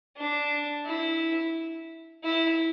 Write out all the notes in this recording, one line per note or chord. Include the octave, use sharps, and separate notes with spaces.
D4
E4
E4